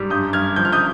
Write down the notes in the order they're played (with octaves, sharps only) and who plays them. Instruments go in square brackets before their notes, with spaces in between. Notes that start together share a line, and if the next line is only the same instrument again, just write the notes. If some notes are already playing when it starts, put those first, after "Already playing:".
Already playing: [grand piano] G#2 G3
G2 D#6 G6
G2 F6 G#6
F3 G6
F6
D#6 G6